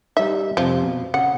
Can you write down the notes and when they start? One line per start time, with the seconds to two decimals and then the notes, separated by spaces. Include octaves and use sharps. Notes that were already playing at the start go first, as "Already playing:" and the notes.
0.17 G3 D#4 E5
0.57 F2 C3 F3
0.83 B2
1.14 C#3 F#5